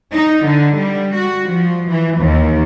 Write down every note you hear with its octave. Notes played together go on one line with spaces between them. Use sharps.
D#4
D3
G3
F#4
F3
E3
D#2